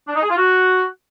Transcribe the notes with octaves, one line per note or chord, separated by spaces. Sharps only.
D4
D#4
G#4
F4
F#4